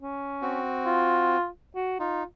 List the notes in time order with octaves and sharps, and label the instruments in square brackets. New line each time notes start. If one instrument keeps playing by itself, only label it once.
[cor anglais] C#4
[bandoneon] C4 F#4
[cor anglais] F4
F#4
[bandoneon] D#4 [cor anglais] F4